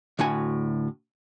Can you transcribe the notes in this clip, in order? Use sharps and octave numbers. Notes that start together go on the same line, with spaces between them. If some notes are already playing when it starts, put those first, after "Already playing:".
D2 A2 F#4 G#5